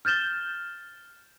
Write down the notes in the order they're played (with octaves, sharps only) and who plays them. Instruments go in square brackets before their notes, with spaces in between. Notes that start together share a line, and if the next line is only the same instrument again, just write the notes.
[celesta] F6 G6 A6 E7 G7